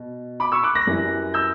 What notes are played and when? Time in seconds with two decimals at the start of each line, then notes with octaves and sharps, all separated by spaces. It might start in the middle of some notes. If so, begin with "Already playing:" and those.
Already playing: B2
0.40 B5 D6
0.52 C#6 E6
0.63 D6 F#6
0.75 F#6 A#6
0.87 F#2 E3 G3
1.34 E6 G6